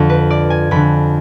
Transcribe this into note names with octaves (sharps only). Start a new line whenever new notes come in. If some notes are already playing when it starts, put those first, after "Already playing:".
Already playing: F2 D3
B4
D5
G#5
F2 D3 B5